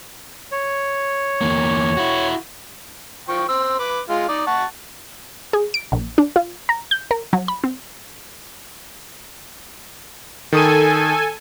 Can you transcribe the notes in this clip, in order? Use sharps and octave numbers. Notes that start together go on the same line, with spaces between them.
C#5
E2 A#3
E4 F#4
F3 G5 C#6
C5 E6
B4 D6
G#3 F4
D#4 D5
F#5 A5 C#6
G#4
D7
A#1
D4
F4
A#5
G6
A#4
F#3
B5
C4
D#3 A4 G#5 D#6 D#7